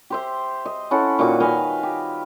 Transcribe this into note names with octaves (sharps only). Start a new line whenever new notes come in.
G4 C5 E5
D#5
C#4 E4 A4 F#5
A#2 D#3 F#4 D6
B4 D#5 F5 G#5
G4